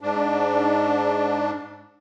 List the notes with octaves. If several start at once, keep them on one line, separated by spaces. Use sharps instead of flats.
G#2 D4